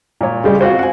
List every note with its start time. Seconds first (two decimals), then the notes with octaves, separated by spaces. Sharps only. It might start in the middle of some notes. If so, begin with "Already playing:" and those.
0.21 A#2 C#5
0.44 C#3 G3 G#3
0.61 C4 F4 F#4 C5
0.79 F#5 G#5